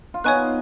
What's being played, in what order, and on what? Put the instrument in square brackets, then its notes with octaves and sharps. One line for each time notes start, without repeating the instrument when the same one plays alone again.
[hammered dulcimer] F4
[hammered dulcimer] B3 D#4 [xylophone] C#5 G#5 C#6 F#6